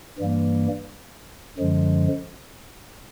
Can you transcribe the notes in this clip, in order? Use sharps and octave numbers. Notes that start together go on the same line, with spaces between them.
G2 E3 G3 A#3
F#2 D3 F3 G#3